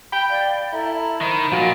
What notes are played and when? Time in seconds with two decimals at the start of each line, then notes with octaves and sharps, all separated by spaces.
0.12 G5 B5
0.29 D5 F5
0.72 E4 A4 A#5
1.21 D#3 C5 B5
1.52 A#2 F3 F#4